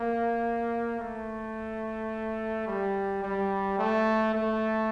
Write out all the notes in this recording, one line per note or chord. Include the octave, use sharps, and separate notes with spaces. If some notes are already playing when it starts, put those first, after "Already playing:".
Already playing: A#3
A3
G3
G3
A3
A3